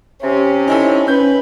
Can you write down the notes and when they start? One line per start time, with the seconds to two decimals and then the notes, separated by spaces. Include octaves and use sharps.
0.22 C3 C#4
0.68 D#4 E4 A4
1.08 C#4 B4 G6